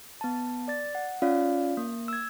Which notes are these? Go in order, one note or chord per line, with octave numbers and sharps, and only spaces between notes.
B3 A5
D5 A6
F#5
C#4 F4 D5 F5
A#3
E6 G#6